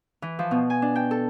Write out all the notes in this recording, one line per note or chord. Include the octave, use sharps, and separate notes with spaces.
E3
F3
B2
G#5
D4
G5
A4